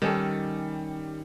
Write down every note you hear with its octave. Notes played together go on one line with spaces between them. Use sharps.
D#3 G3 C#4 A4